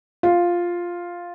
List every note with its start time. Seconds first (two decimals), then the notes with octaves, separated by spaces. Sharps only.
0.23 F4